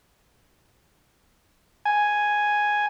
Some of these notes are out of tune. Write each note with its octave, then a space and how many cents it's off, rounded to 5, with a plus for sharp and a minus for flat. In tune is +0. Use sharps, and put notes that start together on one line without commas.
G#5 +0